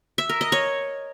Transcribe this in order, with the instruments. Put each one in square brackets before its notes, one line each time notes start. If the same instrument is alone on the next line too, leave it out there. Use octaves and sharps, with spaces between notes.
[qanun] E5
A#4
D#5
C#5